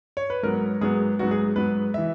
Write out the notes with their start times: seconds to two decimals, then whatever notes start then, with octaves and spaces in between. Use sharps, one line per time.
0.17 C#5
0.30 B4
0.43 G#2 F#3 B3 A#4
0.81 G#2 F#3 B3 G#4
1.19 G#2 F#3 B3 F#4
1.31 G#4
1.56 G#2 F#3 B3 B4
1.94 E3 E5